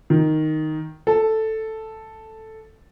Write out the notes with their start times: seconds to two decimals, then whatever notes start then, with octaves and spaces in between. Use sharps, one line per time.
0.10 D#3
1.07 A4